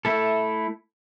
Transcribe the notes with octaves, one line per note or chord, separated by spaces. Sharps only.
A3 E4 A4